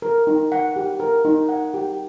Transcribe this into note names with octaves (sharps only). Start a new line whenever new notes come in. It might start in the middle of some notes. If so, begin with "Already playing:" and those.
A#4
D#4
F#5
G4
A#4
D#4
F#5
G4